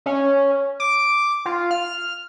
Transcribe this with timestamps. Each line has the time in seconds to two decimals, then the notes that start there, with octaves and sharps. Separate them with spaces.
0.06 C#4
0.80 D6
1.45 F4
1.71 F6